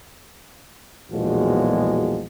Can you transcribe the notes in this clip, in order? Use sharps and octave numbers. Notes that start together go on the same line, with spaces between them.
B1 E2 A#2 F3 G#3 F#4